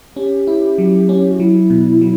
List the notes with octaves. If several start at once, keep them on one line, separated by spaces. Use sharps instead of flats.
C#4 G4
E4
F#3
C#4
F#4
F#3 E4
B2
F#3